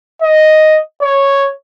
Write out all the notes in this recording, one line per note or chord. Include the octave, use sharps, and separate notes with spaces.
D#5
C#5